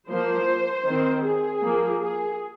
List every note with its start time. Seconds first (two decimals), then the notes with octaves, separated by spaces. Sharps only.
0.10 F3 A#3 C5
0.86 D#3 C4
1.25 G#4
1.62 F3 A#3
2.01 G#4